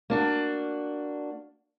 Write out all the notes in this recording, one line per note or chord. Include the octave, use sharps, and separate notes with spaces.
A#3 D4 F#4